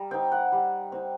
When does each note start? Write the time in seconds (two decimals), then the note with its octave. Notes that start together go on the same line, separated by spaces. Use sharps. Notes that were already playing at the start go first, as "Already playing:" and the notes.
Already playing: G3 A#5
0.11 C4 D#4 G5
0.32 F#5
0.52 G3
0.92 C4 D#4